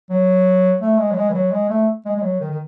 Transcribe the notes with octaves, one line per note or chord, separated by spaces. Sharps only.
F#3
A3
G#3
F#3
G#3
E3
F#3
G#3
A3
G#3
G#3
F#3
D#3
D#3